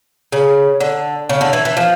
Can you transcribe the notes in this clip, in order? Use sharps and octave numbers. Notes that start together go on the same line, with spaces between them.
C#3
D3
C#3
D3
E3
E3
F3